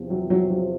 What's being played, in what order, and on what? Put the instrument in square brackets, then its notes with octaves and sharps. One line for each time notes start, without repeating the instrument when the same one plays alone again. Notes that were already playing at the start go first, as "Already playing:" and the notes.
Already playing: [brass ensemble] E2 C3 F3
[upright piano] F#3
F#3
F#3